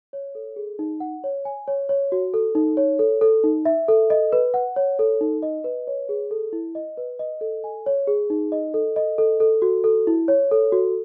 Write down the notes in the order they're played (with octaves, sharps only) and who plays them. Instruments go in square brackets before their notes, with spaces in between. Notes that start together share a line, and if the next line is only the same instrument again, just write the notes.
[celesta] C#5
A4
G#4
D#4
F#5
C#5
G#5
C#5
C#5
F#4
A4
D#4
C#5
A4
A4
D#4
E5
A4
D#5
B4
F#5
C#5
A4
D#4
D#5
B4
C#5
G#4
A4
E4
D#5
B4
D#5
A4
G#5
C#5
G#4
D#4
D#5
A4
D#5
A4
A4
F#4
A4
E4
C#5
A4
F#4